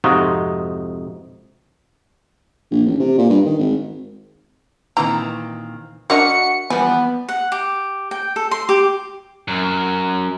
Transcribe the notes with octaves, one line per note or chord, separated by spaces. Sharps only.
F2 G#2 C3 D#4 F4 F#4
A#1
A1
C3
A#2
G2
D#3
G#1
A#2 D#3 E3 C4 A#5
D4 F#4 A#4 D#5 E5 F#5 C#7
E3 F3 G3 B3 G#5
F#5
G4
G5
A4
C6
G4
F#2